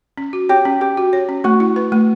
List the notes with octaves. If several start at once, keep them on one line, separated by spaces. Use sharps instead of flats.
C#4
F#4
G4 C#5
C#4
C#4 G4
F#4
C#5
C#4
A3 F#4
E4
B4
A3